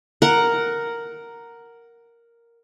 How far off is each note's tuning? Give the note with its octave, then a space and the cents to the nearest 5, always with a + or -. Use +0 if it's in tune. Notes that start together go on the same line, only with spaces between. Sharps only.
A#4 +0 F#5 +0